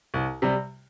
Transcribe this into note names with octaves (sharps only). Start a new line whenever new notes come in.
C2
C3 G3